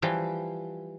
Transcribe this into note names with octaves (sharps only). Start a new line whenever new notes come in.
E3 F3 G3 G5 G#5